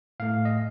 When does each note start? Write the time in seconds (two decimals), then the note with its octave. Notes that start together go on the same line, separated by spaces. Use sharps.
0.20 A2 A3 F5
0.45 D#5